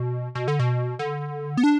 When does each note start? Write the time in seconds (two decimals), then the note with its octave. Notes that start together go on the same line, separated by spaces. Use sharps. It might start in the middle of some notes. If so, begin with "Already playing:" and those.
Already playing: B2
0.35 B2
0.48 D3
0.59 B2
0.99 D3
1.57 B3
1.64 D4